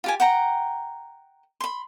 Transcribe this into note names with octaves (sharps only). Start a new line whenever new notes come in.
F4 G4 G#5
F#5 G5 A#5
B5 C6